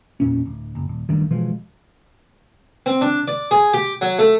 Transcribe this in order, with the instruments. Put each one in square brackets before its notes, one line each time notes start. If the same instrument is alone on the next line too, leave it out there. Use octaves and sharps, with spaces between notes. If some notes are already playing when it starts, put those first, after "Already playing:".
[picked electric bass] E2 A#2 C#4
D1
F#1
D#1
A1 G2 D#3
B2 E3 F3 G#3
[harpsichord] C4
D4
D5
G#4
G4
F#3
A3